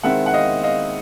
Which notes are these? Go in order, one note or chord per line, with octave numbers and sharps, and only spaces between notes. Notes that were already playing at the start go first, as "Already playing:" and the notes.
D#3 G#3 C4 E4 E5 F#5
F#5
D#5 F5
D#5 F5